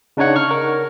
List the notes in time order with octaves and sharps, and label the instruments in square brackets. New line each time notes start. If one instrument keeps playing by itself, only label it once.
[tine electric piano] C#3 D4 D#4 C#5 F#5
C#6 F6
A#4